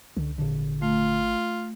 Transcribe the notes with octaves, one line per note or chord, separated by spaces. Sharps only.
C#2 D3
G#1 A#2 D3
A3 F4